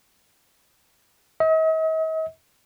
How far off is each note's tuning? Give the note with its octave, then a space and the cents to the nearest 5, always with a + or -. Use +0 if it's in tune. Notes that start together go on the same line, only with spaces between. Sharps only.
D#5 +45